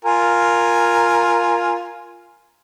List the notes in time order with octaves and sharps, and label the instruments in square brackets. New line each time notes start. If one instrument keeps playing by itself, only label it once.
[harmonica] F4 A#4 G#5